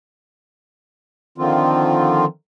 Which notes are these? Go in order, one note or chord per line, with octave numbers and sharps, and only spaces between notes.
D3 D#3 F3 C4 F4